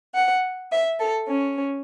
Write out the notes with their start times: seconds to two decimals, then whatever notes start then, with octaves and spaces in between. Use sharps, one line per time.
0.15 F#5
0.72 E5
0.99 A4
1.28 C#4